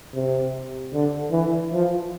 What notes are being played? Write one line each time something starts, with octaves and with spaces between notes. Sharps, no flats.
C3
D3
E3
F3